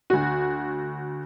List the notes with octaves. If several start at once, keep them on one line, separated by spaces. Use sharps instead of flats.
D2 F#4